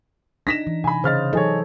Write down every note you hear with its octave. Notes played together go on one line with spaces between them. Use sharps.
D4 D#4 A#6 B6 E7
E3
C3 G#5 B5
C#3 C5 D#5 F6 A6
E3 F#3 D#4 G#4 A4 C#5